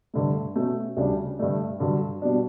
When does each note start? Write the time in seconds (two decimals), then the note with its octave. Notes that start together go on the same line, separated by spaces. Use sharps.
0.13 G2 D3 A3
0.55 B2 A3 C#4
0.97 D2 C#3 G3 D4
1.39 G2 D3 A3 D4
1.80 G2 D3 F#3
2.22 B2 G3 D4